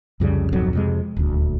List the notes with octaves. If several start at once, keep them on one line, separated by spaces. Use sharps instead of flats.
C2 F2 C#3 G3
D1 B1 F2 F#3
F2 C3 G#3
D#1 D2